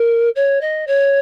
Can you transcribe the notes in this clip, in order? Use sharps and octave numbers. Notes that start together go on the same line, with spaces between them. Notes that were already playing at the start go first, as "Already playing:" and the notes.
Already playing: A#4
C#5
D#5
C#5